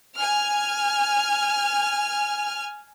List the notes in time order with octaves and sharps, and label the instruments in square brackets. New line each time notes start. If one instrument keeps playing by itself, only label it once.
[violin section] G#5 F6